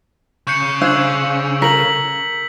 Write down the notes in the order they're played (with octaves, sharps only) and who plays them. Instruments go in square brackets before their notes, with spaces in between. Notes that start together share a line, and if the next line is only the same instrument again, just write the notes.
[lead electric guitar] C#3 [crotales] F#6 G6 C#7
[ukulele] D4 C5 F5 [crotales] E6 G6 G#6
[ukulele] A#4 [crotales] B6 F#7